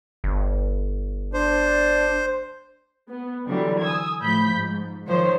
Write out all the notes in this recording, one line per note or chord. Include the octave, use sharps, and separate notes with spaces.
G1
D4 C5
B3
D3 E3 F#3 G3
G#5 D#6 E6 G#6
A2 F3 B5 G6 B6
G#2
D#3 F3 C5 C#5